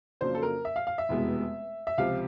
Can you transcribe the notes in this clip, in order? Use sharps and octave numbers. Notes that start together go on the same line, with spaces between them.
F2 C#3 F#3 A#3 D4 C5
A4
A#4
E5
F5
F5
E5
F1 E2 B2 G#3 B3
E5
C#2 C3 F3 F5